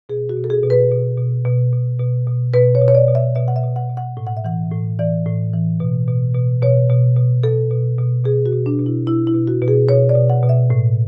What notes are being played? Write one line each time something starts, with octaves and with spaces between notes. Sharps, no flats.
B2 G#4
F#4
B2
A4
G#4
B2
B4
B2
B2
B2
B2
B2
B2
B2 B4
C#5
B2
C#5
D5
B2
E5
B2 E5
F#5
E5
B2
F#5
B2
F#5
A2
F#5
E5
E3 F#5
A2
E3 D5
A2
E3
B2
B2
B2
B2 C#5
B2
B2
B2 A4
B2
B2
B2 G#4
F#4
B2
D4
B2
E4
B2 E4
E4
B2
F#4
B2
G#4
B2 C#5
D5
B2
F#5
B2
E5
A2